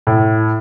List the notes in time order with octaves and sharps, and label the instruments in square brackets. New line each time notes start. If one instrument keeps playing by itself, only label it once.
[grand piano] A2